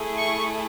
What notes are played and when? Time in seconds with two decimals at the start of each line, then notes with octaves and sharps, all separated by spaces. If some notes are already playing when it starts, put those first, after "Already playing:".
Already playing: A3 E4 G#4
0.18 C#6